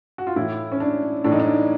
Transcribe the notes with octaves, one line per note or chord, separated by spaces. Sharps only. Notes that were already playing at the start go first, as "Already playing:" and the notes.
F#4
F4
A2 E3 E4
C#4
D4
A2 E3 D4
D#4
D4